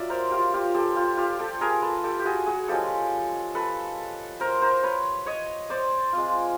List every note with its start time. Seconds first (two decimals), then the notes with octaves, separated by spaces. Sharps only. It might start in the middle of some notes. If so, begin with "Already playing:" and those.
Already playing: F#3 D4 F4 D5 E5
0.09 A#4 C5
0.31 F4 G4
0.54 F4 G4
0.75 G4 A4
0.96 F4 G4
1.17 F4 G4
1.39 G4 A4
1.61 G#4 A#4
1.82 A4 B4
2.04 G4 A4
2.19 G4
2.25 F#4 G#4
2.46 F#4 G#4
2.68 F3 G#3 C#4 G4 A4
3.55 A4 B4
4.40 A#4 C5
4.62 A#4 C5
4.83 B4 C#5
5.26 C#5 D#5
5.70 C5 D5
6.13 G#3 C4 F4